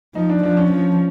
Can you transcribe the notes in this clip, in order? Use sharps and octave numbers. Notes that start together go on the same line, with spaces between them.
F3 D#4
D4
F3 D4
C#4
F3